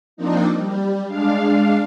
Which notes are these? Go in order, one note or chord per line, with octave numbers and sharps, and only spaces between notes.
F3 A#3 C4 D4 D#4
G3
G#3 D4 F5